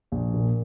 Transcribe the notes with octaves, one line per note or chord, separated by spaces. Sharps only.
A#1
A#2